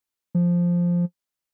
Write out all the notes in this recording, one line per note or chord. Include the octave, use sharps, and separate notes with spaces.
F3